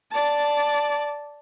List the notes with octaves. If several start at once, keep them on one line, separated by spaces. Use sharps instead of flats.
D5 A5